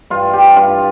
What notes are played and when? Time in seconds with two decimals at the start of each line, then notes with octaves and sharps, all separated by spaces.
0.10 G2 F4
0.33 G4
0.56 G2 F4